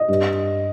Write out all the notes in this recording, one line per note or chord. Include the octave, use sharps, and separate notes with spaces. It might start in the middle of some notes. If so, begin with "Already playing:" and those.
Already playing: D#5
G2